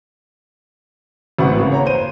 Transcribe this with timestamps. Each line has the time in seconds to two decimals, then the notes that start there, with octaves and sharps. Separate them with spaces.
1.39 G#1 A2 F#4 B4 F#5 C#6
1.59 C#3 A#3
1.72 C#5 A#5
1.86 C5 D#7